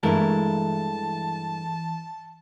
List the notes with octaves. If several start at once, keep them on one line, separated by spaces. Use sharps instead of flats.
G2 E3 G#3 A3 E4 A#4 A5